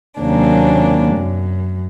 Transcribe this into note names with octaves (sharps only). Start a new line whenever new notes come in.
D#2 C3 F#3 A#3 C#4 D4
F#2